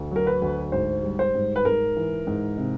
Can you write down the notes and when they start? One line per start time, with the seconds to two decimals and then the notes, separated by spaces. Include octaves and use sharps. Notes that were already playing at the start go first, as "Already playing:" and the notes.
Already playing: D2
0.11 F#3 A#4
0.27 B4
0.42 D2
0.72 G#2 C5
1.03 G3
1.19 C5
1.35 G#2
1.56 B4
1.65 G#2 A#4
1.97 E3
2.27 G#2
2.57 C3